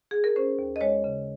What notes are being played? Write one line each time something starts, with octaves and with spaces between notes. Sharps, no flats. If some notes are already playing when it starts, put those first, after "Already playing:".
G#4
A#4
C#4 C5
D#2
D#5
G#3 C#5
C#3